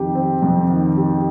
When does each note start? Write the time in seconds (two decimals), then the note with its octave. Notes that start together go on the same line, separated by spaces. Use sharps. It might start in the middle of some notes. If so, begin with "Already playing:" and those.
Already playing: F2 D#3 G4
0.15 C4
0.42 F2
0.70 D#3
0.97 G4